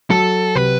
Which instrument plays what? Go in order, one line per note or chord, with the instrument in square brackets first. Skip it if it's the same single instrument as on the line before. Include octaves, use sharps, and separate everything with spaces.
[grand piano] F#3 [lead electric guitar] A4
[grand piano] C3 [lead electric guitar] B4